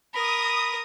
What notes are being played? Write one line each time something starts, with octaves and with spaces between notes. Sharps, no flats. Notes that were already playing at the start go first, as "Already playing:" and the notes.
A#4 B5 D#6